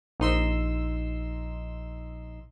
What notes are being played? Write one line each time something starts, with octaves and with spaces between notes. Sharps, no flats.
A#1 D#4 C6 E6